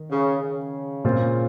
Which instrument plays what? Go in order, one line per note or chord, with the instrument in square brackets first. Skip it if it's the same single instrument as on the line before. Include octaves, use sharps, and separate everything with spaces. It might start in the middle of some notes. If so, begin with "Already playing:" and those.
Already playing: [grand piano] D#3
[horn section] C#3
C#3
[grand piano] A#2 G#3 C4 F4